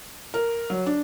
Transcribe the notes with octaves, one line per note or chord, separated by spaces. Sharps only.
A#4
F#3
D4